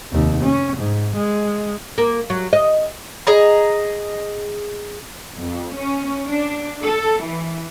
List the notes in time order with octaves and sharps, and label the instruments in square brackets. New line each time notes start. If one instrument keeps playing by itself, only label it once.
[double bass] F1 D#2
C#4
G#2
G#3
[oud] A#3
F#3
D#5
[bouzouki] G#4 D#5 A#5
[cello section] F2
C#4
D4
A4
E3